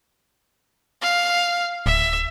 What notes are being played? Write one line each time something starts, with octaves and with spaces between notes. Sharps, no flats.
F5
D1 E5